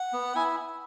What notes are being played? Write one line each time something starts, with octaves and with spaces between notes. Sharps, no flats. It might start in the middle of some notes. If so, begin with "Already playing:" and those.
Already playing: F#5
B3
E4 G#5